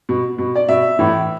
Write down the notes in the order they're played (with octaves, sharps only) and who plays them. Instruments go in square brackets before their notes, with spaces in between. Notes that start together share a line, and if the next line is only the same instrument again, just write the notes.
[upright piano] B2
B2
D5
B2 E5
A2 E3